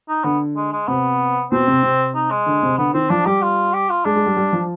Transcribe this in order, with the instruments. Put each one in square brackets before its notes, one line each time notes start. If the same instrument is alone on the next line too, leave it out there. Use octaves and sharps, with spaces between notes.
[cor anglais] D#4
[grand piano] D3 [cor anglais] B3
[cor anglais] G#3
G#3
[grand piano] C3 [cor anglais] B3
[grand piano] B2 [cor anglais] C4
[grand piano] C3
C3
[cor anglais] D#4
G#3
[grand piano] D3
C3
[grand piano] D3 [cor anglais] B3
[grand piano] D#3 [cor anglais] C4
[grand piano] F3 [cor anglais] D4
[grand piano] G3 [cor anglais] G4
[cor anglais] F4
G4
F4
[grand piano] G#3 [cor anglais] D4
[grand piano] G#3
G3
G3
F3